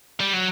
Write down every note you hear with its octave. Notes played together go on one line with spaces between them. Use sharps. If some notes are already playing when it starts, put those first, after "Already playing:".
G3
F#3